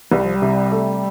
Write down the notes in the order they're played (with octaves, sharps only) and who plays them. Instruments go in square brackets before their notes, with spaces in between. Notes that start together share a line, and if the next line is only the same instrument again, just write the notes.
[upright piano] C2 [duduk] G3
[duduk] F3
G3
[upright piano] C3
A3